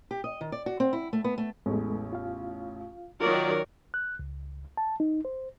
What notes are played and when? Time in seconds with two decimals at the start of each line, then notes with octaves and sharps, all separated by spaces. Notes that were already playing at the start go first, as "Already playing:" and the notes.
0.11 G4
0.24 D#5
0.41 D#3
0.52 D5
0.66 F#4
0.80 C4
0.93 E4
1.13 A3
1.24 B3
1.38 A3
1.66 A1 E2 G#3 B3 A4
2.13 F4 F5
3.20 D#3 F#3 F4 A#4 C#5 D5
3.94 F#6
4.19 C#2
4.77 A5
5.00 D#4
5.25 C5